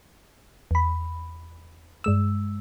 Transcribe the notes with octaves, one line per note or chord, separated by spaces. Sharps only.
E2 B5
G2 G#3 E6